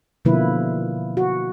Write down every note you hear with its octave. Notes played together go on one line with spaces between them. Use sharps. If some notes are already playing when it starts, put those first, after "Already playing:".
B2 D3 F3 A#3 E4 B4
F#4